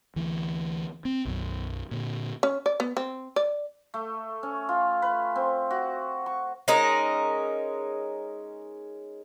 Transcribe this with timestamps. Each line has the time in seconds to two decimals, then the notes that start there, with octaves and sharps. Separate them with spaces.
0.16 D2 E3
1.05 C4
1.25 B1 F#2
1.91 A#2 D3
2.43 C#4
2.66 D5
2.80 B3
2.97 C4
3.36 D5
3.94 A3
4.43 C#4
4.69 F4
5.02 B4
5.36 C4
5.71 F#4
6.26 C#6
6.68 G#3 C#4 D#4 A#4